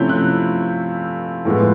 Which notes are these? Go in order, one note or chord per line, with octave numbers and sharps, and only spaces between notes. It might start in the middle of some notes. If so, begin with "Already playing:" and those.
Already playing: C3 F3 A3 C#4 E4 G6
F#6
A2 F3 G#3 B3